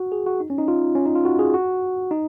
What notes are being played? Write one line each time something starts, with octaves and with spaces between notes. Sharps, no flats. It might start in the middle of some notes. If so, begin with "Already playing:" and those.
Already playing: F#4
G#4
F#4
D#4
C#4
D#4
F4
C#4
D#4
F4
F#4
G#4
F#4
D#4